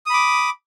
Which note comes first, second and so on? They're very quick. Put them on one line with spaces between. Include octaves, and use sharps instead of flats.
D#6 B5 D6